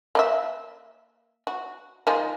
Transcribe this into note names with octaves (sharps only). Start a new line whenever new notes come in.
A#3 D#5 E5
F#4
D#3 F3 G#3